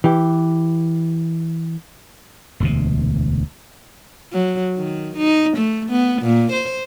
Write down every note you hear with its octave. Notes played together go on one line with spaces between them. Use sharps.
E3 G4
E1 D2 C3
F#3
D#3
D#4
A3
B3
A#2
C5